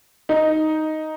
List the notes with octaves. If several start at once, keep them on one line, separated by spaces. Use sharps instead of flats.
D#4